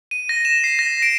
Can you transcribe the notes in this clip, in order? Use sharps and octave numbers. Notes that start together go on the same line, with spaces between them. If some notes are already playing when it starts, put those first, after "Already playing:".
D#7
A#6
E7
C7
A#6
D7